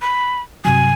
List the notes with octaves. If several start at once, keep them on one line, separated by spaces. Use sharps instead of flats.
B5
G2 C3 F#3 G#5